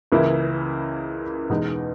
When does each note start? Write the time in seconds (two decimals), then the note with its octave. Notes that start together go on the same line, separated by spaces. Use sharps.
0.12 C#2 C#3 E3 A#3 E4
1.50 E2 B2 G#3 D#4